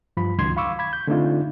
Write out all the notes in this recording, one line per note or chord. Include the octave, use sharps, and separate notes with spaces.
G2 F3 B5
C#2 D#3 F#3 C6 G#6
F5 B5 C#6 D6 E6
B5 G#6
G6
D3 A3 C4 D4 D#4 F4